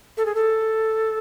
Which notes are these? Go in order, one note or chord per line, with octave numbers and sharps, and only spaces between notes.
A4
G#4
A4